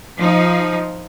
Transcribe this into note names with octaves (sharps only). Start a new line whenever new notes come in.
F3 D#4